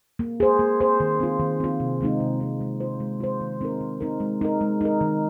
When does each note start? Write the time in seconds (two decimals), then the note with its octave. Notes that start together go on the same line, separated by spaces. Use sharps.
0.19 A#3
0.40 G#4 C5
0.59 A#3
0.80 G#4 C5
1.00 D#3
1.20 C4 F4
1.39 D#3
1.60 C4 F4
1.80 C3
2.01 D#3 G#3 C4 D#4
2.20 C3
2.40 D#3 G#3 C4 D#4
2.61 G#3
2.80 F4 C5
3.00 G#3
3.20 F4 C5
3.41 D#3
3.61 C4 D#4 A#4
3.81 D#3
4.01 C4 D#4 A#4
4.20 G#3
4.41 D#4 A#4
4.61 G#3
4.81 D#4 A#4
5.01 D#3